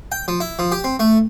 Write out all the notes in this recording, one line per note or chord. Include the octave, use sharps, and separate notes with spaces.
G5
F3
E4
F3
G4
C4
A3